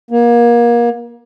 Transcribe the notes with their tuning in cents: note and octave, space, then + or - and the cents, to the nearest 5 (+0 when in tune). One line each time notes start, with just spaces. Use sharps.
A#3 +30